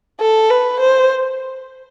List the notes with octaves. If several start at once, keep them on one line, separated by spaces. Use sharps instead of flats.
A4
B4
C5